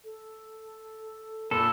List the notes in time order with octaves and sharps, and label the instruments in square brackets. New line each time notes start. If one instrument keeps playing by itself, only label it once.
[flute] A4
[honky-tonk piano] A#2 [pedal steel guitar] A4 [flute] B5